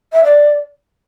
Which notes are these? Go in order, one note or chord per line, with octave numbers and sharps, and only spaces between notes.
E5
D5